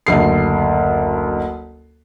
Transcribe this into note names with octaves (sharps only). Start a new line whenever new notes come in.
F#1 D2 C7